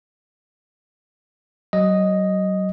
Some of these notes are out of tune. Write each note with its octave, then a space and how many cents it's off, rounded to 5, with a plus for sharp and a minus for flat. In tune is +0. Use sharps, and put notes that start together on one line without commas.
F#3 +35 D#5 +0